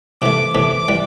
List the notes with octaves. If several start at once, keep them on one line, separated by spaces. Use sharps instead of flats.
C3 E3 A3 D6
C3 E3 A3 D6
E3 G3